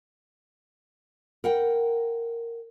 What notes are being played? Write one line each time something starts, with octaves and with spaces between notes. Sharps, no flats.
A#4 F#5 G5